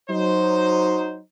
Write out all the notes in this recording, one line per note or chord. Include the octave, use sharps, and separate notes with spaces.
F#3 D#4 C5